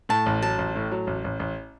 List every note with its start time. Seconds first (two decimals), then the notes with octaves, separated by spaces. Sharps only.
0.09 A2 A5
0.26 A1
0.42 F#3 A5
0.58 A1
0.75 A2
0.92 F#3
1.07 A1
1.24 A1
1.39 A1